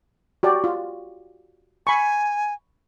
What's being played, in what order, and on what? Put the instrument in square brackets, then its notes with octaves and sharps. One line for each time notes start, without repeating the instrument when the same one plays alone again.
[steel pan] F#4 G4 D5
F4
[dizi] G#5 [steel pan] B5 C#6